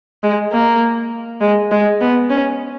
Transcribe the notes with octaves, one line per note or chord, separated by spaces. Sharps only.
G#3
A#3
G#3
G#3
B3
C#4